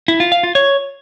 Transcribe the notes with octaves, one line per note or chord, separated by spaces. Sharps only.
E4
F4
F5
F4
C#5